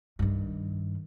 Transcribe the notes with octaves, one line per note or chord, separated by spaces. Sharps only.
G2 D#3